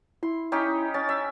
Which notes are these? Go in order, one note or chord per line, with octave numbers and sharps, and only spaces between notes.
E4 C6
C#4 D#4 G4
C#4 A6
E5